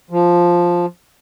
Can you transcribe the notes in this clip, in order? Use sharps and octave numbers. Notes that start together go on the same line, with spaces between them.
F3